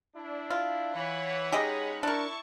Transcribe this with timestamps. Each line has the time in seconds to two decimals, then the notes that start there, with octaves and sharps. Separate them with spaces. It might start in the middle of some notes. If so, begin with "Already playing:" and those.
0.15 D4 E4
0.50 F4
0.94 E3 C#5 F#5 B5
1.52 G#3 C#4 D#4 G4 G#4 D#5
2.03 D4 E4 A#4 A5 C#6